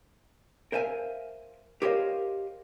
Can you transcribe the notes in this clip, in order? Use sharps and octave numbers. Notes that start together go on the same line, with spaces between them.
A#4 C5 E5 F5 G#5
G4 A#4 C5 C#5 D#5 F5